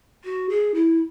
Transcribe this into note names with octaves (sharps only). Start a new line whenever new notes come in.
F#4
G#4
E4